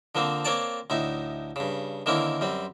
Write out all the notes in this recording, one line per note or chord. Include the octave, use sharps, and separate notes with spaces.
D3 F3 A#3 C4
A#3 C4 C#5 D5 A5
D2 A2 D#4 E5
G2 C#3
D3 D#3 A#3 C4 C#4 E4
F#2 G3 C4